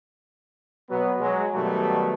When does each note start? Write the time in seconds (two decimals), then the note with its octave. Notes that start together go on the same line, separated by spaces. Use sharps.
0.89 B2 F#3 B3
1.20 F#3 G#3
1.53 B2 D#3 F#3 G3 A3